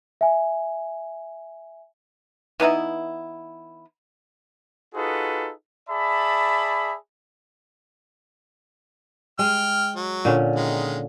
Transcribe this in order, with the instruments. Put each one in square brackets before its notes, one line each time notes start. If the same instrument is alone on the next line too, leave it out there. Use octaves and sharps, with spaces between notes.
[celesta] E5 G#5
[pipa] E3 B3 D#4 E4
[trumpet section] D#4 F4 F#4 G#4 A4 B4
G#4 D5 E5 A5 B5
[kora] G#3 [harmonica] G5 F6
[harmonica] F#3
[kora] A#2 D3 C#4
[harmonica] D#3 G#3